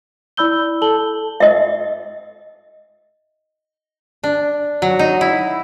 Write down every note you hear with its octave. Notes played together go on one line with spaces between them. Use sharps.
E4 D5 B5 E6 G6 G7
A4 A5 F#7 G7
D#5 E5
D4
F#3
D#4
E4